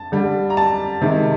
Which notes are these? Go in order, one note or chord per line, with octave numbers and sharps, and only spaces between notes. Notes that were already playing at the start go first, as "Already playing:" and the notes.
Already playing: A5
D3 G3
A#5
A5
C3 D#3 G#3